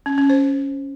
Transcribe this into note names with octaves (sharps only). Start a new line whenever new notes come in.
C#4
C#4
C5